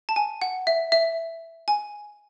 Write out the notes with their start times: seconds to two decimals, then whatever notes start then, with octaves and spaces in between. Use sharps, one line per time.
0.09 A5
0.16 G#5
0.42 F#5
0.67 E5
0.92 E5
1.68 G#5